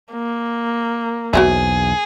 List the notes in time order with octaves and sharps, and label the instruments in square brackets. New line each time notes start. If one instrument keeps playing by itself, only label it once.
[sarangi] A#3
[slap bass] B1 E2 [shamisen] F#4 C5 E5 [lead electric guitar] G#4